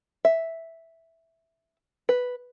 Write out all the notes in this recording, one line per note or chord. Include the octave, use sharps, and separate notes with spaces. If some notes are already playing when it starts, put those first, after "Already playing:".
E5
B4